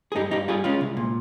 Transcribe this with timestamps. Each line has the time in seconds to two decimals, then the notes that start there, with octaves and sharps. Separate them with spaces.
0.12 G#4
0.16 G2 D#4 G4
0.31 G2 D#4 G4
0.48 G3 F4 G#4
0.64 G#3 C#4 F4
0.81 C2
0.97 A#2